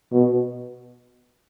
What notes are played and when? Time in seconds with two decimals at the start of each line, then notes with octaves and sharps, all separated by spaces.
0.11 B2